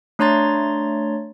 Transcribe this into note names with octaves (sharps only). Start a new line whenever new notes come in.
A3 D4 C#5 A#5 C6 A6